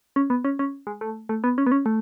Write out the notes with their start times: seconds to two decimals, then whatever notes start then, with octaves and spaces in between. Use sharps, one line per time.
0.16 C#4
0.30 B3
0.45 C#4
0.59 C#4
0.87 G#3
1.01 A3
1.29 A3
1.44 B3
1.58 C#4
1.66 B3
1.72 C#4
1.86 A3